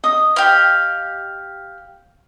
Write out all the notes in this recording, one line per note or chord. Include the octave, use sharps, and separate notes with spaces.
D#5 D#6
G4 F5